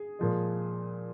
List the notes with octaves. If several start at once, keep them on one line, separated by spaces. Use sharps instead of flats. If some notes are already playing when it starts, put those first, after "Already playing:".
Already playing: G#4
A#2 F3 G#3